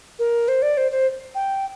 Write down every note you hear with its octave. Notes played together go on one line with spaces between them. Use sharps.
A#4
C5
D5
C5
C5
G5